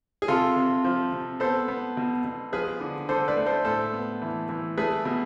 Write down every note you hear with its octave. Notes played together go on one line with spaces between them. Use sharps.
G#4
C3 F4 A4
C3
F3
C3
B3 A4 C5
B3
B2
B2
F3 G#4 B4
D3
D3 A4 C5
B4 D5
A3
A4 C5
A2 A4 C5
B3
E3
E3
A3 G#4 B4
B2